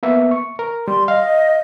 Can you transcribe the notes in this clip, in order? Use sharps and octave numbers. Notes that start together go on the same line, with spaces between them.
A#3 B3 E5
C#6
A#4
G3 C6
D#5 F5